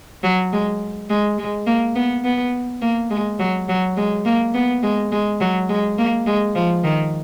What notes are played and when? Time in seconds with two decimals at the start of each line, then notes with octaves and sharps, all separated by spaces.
0.23 F#3
0.52 G#3
1.10 G#3
1.38 G#3
1.66 A#3
1.96 B3
2.24 B3
2.82 A#3
3.10 G#3
3.39 F#3
3.69 F#3
3.97 G#3
4.25 A#3
4.54 B3
4.83 G#3
5.12 G#3
5.41 F#3
5.69 G#3
5.98 A#3
6.27 G#3
6.55 F3
6.84 D#3